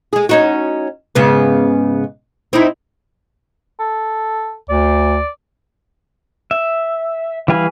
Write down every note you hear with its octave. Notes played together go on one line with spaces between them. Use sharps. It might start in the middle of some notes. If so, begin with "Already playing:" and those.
G#3 G#4
C#4 D#4 F#4
G#2 C#3 B3
C4 D#4 E4
A4
D2 D5
E5
E3 G3 F5 G#5 B5